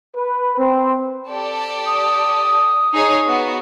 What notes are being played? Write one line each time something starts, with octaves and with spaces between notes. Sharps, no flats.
B4
C4
G4 A4 D5
D#6
D#4 G#4 C#5
B3 F#4